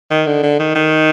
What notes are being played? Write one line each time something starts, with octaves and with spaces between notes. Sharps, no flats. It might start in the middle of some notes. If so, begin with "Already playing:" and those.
D#3
D3
D3
D#3
D#3